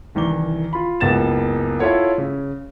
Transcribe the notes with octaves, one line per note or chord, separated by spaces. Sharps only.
C2 D#3 E3 G7
F4 B5
F#1 C#2 B3 A6 E7
E4 F4 A4 C#5 F#5
C#3